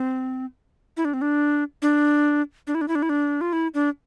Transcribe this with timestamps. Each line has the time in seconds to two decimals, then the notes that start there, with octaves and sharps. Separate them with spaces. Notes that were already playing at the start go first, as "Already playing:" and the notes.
Already playing: C4
0.97 E4
1.05 D4
1.14 C4
1.22 D4
1.82 D4
2.67 D4
2.75 E4
2.81 D4
2.88 E4
2.95 D4
3.02 E4
3.09 D4
3.41 F4
3.53 E4
3.74 D4